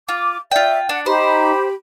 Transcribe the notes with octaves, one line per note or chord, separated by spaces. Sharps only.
F4 D6
F4 D5 E5 G5
D4 F#5
D#4 G4 C5 B5